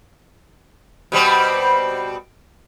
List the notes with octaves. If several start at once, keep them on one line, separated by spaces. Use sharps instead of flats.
B2 G3 C4